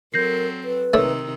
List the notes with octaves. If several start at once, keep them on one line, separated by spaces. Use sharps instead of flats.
F#3 C4 A4 A#4 G6 A#6 C7
B4
C3 D#3 A3 D4 D#4 A#4 C#5 E6